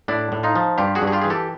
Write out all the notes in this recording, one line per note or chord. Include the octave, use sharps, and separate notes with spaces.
A2 D4 E4
A2
D#4 F4
F3
G2 F4 G4
F#4 G#4
G2
G#4
F4 G4
E3 G#4
G4 A4